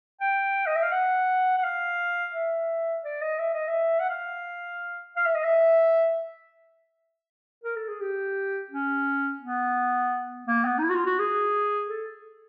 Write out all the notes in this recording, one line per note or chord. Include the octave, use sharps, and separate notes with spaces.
G5
D#5
E5
F5
F#5
F#5
F5
E5
D5
D#5
E5
D#5
E5
F#5
F5
F5
E5
D#5
E5
A#4
A4
G#4
G4
C#4
B3
A#3
B3
D#4
E4
F#4
F4
F#4
G#4
A4